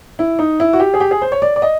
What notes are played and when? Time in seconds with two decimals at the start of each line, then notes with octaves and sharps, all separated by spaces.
0.19 E4
0.39 D#4
0.60 E4
0.73 F#4
0.80 G4
0.94 G#4
1.00 G4
1.11 G#4
1.22 C5
1.32 C#5
1.42 D5
1.56 D5
1.62 D#5